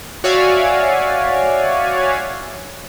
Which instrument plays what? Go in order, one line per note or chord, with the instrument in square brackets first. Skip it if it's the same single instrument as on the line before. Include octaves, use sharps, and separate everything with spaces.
[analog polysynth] F#4 C#5 D5 E5 F5 G#5